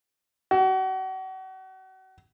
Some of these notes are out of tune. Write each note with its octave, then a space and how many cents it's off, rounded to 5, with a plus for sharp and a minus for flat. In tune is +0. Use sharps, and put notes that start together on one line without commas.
F#4 +35